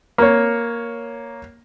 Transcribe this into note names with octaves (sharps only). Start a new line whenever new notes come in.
A#3 C#5